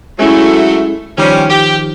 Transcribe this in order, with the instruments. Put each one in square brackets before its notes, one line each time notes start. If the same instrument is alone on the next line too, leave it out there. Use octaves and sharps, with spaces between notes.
[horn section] F#3 A3 [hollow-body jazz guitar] G#3 C#4 E4
[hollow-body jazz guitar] D#3 F3 [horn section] G3 C#4
[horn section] G4